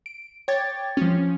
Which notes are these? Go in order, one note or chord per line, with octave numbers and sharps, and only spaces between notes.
D7
C#5 G5 D6 G#6 A6
F3 C#4